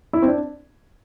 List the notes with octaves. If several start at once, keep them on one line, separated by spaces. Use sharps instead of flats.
E4
C4
D4